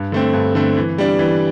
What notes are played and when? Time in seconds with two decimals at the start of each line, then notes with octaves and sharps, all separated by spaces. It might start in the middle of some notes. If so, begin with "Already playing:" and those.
Already playing: G2
0.12 D3 A3 C4
0.33 G2
0.55 D3 A3 C4
0.77 E3
0.98 G3 D4
1.19 E3